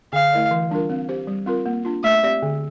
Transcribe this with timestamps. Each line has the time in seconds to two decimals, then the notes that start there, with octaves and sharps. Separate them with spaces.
0.13 D3 F5
0.32 A3 E4 A#4 D5
0.51 E3
0.70 G3 D4 F4 A#4
0.89 C4
1.09 G4 C5
1.27 G3
1.46 C4 F4 A#4
1.66 A#3
1.85 D4 F4
2.04 A3 E5
2.23 C4 G4 D5
2.42 D3